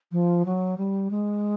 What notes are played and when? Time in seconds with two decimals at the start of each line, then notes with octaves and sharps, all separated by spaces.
0.12 F3
0.46 F#3
0.78 G3
1.11 G#3